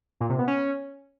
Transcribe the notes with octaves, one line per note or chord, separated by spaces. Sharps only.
A#2
C3
B3
C#4